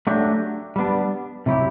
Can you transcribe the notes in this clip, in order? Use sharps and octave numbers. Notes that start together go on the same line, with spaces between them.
F#3 A3 D4 G4
G3 B3 D4
C3 F#3 A3 E4 G4